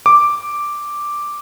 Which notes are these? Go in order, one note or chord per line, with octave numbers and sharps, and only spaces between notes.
D6